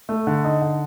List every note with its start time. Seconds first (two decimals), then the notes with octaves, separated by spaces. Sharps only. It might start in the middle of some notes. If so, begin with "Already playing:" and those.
0.09 A3
0.27 D3
0.44 D#4
0.62 D3